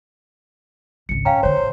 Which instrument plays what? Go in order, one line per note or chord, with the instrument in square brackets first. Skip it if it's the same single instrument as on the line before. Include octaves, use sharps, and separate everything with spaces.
[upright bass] G#1 C#2 [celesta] C#7
[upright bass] A#2 [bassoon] C#4 [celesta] F5 G5 A#5
[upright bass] D2 D3 [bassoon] C5 [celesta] C#5
[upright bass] A1